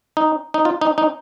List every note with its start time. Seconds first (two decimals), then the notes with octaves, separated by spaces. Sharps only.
0.17 D#4
0.54 D#4
0.65 F4
0.81 D#4
0.98 D#4